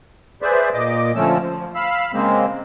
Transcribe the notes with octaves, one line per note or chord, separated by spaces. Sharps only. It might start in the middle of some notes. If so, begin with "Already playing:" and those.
G#4 B4 C5 D5 E5
A#2 D#5 D6
D3 F3 A3 C#4 E6
F3
F5 B5 E6
C#3 G#3 A#3 C4